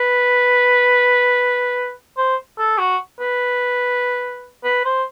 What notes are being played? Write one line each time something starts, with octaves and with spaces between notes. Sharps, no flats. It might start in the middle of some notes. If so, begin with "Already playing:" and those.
Already playing: B4
C5
A4
F#4
B4
B4
C5